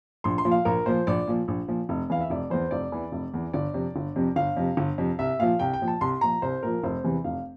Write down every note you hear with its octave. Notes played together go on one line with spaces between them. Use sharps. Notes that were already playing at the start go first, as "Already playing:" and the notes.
A#1 C6
C6
A#2 F3
F5
A#1 A#4
A#2 F3 C5
A#1 D5
A#2 F3
A#1
A#2 F3
F1
E2 E3 F5
E5
F1 D5
E2 E3 C5
F1 D5
E2 E3
F1
E2 E3
G1 D5
F2 C3
G1
F2 C3
G1 F5
F2 C3
G1
F2 C3
C2 E5
A#2 F3 F5
C2 G5
G5
A#2 F3
A5
C2 C6
A#2 F3 A#5
C2 C5
A#2 F3 A#4
F1 C5
E2 C3 E3
F1 F5